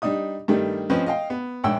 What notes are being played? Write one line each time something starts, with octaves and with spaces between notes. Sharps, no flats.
G3 D4 D#4 D#6
G2 D#3 G3 A3
F3 C4 C#4 B4 D#5
D#5 F5 G5
B3
A#1 G#2 C#5 G5 E6